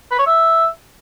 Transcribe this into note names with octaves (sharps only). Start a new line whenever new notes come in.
B4
C#5
E5